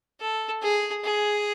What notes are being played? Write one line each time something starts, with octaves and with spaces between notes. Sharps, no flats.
A4
G#4
G#4